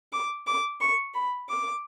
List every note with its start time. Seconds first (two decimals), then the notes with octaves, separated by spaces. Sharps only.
0.13 D6
0.47 D6
0.81 C#6
1.14 B5
1.49 D6